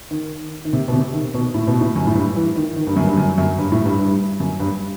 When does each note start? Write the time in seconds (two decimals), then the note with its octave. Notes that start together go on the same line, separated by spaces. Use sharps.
0.11 D#3
0.65 D#3
0.73 C3
0.88 B2
0.93 C3
1.13 D#3
1.34 B2
1.54 A2
1.67 B2
1.81 A2
1.96 F#2
2.07 A2
2.15 G2
2.36 E3
2.56 D#3
2.76 D#3
2.87 G2
2.96 F#2
3.07 G2
3.17 F#2
3.38 F#2
3.58 G2
3.72 A2
3.85 G2
3.99 G2
4.40 F#2
4.60 G2